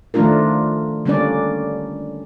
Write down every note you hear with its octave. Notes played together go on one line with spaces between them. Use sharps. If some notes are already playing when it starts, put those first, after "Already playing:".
D#3 F3 A3 D4 F4 A#4
D3 G3 A#3 C#4 D4 D5